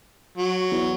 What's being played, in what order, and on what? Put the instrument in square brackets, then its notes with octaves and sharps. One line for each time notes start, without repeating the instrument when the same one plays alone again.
[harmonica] F#3
[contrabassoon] E2